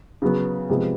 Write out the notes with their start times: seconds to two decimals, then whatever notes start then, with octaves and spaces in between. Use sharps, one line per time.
0.22 C#3 F#3 B3
0.69 C3 F3 G#3 B3